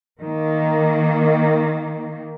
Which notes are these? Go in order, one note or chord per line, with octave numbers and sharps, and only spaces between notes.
D#3 A#3